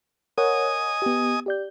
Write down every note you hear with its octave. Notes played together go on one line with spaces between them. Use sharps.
A#4 C#5 D#5 F#5 G#5 D#6
B3 G4
G4 D5 G6